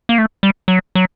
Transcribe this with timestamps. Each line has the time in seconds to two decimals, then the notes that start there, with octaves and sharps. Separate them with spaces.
0.09 A#3
0.18 A3
0.43 G3
0.68 F#3
0.95 F#3